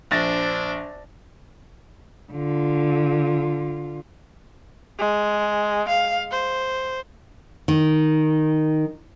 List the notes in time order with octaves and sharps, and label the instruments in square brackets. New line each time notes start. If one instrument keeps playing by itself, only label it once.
[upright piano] A#1 A6 A#6 [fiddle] D4 C5
[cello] D3 F4
[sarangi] G#3
F5
C5
[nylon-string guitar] D#3